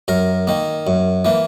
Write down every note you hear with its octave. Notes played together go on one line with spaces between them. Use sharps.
F#2 A#4
D#3 A#3
F#2
E3 A#3